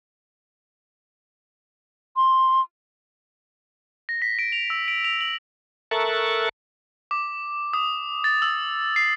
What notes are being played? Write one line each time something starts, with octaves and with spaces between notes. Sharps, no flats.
C6
A#6
B6
D7
F7
E6
D7
F7
F#7
A4 A#4 E5 C#6 F#6 A6
D6
D#6
A6
E6
C7